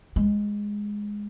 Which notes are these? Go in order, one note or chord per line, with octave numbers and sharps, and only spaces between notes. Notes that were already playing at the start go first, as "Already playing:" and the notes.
G#3